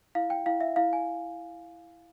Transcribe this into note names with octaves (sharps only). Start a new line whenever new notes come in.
E4 F5
G5
E4 F5
E5
E4 F5
G#5